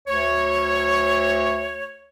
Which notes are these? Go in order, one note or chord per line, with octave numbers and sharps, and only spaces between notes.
D2 C#5